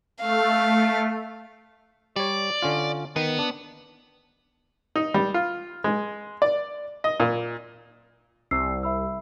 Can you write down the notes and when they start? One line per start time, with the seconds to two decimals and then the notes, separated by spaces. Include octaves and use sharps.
0.21 A3 F5
2.16 G3 C#5 D5
2.62 D3 C#4 F4
3.16 D#3 B3
3.39 D4
4.95 D#4
5.14 G3
5.34 F4
5.84 G#3
6.42 D5
7.04 D#5
7.20 A#2
8.51 C2 E6 C7
8.83 E5 B5 E6